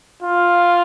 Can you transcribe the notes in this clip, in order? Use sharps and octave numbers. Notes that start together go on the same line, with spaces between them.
F4